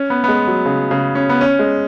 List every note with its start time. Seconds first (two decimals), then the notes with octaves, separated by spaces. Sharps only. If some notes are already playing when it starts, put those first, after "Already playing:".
Already playing: C#4
0.10 B3
0.24 B3
0.28 G#3
0.47 F#3
0.65 C#3
0.91 C#3
1.15 C#4
1.29 B3
1.41 C#4
1.59 G#3